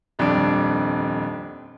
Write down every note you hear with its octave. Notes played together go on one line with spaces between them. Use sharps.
D#1 F2 G3 D4 D5 D7